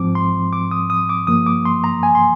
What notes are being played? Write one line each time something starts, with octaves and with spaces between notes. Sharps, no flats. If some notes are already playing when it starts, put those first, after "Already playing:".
Already playing: G#2 F3 C4 D6
C6
D6
D#6
D#6
D6
G2 F3 A#3 D#6
D6
C6
A#5
G#5
C6